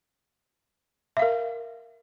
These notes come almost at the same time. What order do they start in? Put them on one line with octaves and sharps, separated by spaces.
E5 F5 A#4